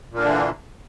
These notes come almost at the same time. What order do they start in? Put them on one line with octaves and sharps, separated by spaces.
A#2 A#3 D4 D3 E3